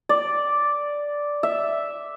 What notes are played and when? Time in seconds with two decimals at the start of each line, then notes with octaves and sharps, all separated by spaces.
0.09 D5
1.43 E5